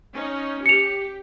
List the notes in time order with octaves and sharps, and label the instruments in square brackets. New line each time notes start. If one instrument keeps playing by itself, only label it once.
[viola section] C#4 D#4
[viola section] G4 [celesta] C#7 F7